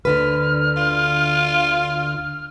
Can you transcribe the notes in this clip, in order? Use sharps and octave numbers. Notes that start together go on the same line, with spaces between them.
D2 D3 B4 F6
F4